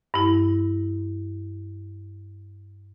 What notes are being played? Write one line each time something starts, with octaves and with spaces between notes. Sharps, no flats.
G2 E4